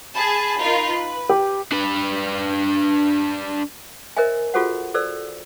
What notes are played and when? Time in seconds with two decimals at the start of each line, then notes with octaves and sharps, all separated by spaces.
0.15 G#4 A5 B5
0.60 D#4 F4 A#4
0.91 B4
1.29 G4
1.72 D4 B4
4.17 A#4 C5 D#5 E5 G#5
4.54 F4 F#4 G#4 A4 C5 F#5
4.94 A4 C5 D5 E6